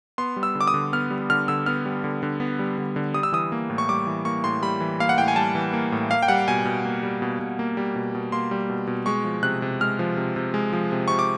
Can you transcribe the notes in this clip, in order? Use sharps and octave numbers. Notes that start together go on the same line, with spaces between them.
B3 C6
G3
E6
D3
D6
D#6
D3
B3 F6
G3
D3 F6
D3 E6
B3 F6
G3
D3
D3
B3
G3
D3
D3
G3 D#6
E6
E3 D#6
A#3
A2
C#6
G3 D6
E3
A#3 C#6
A2 C6
G3 B5
E3
A#3 F5
F#5
A2 G5
G#5
G3 A5
E3
A#3
A2
A#3 F5
G5
G3 F#5
B2 G#5
B2
A#3
G3
B2
B2
A#3
G3
B2
B2
A#3 C6
G3
B2
B2
G#3 C#6
F3
C3 F#6
C3
G#3 F6
F3
C3
C3
G#3
F3
C3
C3 C#6
D6